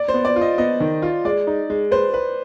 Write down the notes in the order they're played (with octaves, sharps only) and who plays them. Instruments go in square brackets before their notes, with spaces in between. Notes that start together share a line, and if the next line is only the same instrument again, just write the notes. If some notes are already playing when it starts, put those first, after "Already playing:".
Already playing: [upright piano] D5
C5
[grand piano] B3
[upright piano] D5
[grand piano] F4
[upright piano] D#5
[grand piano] B3 [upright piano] D#5
[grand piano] D#3
F4
[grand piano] G#3 [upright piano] D5
[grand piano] D#4
G#3
[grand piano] B4 [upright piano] C5
[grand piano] B4